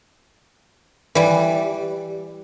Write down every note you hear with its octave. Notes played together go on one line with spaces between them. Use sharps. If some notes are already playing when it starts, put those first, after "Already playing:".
E3 G3